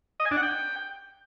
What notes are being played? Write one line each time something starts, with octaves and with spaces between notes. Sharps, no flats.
D#5
G#5
D4
F#5
G5